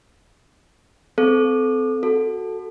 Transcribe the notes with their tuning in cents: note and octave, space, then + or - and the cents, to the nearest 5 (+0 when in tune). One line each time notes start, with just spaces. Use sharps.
C4 -30 A4 -20
F#4 +0 A4 +0